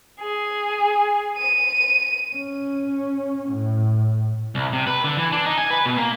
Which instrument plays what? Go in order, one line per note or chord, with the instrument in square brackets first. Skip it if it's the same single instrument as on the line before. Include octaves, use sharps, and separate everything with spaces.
[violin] G#4
D#7
[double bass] C#4
A2
[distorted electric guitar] C2
C3
B4
D3
E3
D4
D#4
G#5
B4
B2
A#3